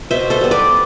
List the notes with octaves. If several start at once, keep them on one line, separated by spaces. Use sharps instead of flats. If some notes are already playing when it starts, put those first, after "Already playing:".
B2 C5 E5
A4 C5
G3 B3
B4 D5